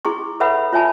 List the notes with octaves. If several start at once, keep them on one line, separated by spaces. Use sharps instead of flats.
E4 G#4 C6 C#6
A4 B4 C#5 E5 F#5 B5
F4 C#5 E5 G#5 A5 B5